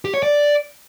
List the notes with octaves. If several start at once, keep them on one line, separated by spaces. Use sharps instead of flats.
G4
C#5
D5